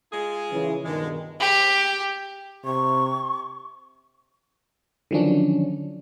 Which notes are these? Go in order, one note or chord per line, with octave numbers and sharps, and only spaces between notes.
G#3 F4 G#4
C#3 E3
G2 B2 D3 D#3 F3 G#3
G4
C3 C#6
D3 D#3 F3 F#3 C#4 D4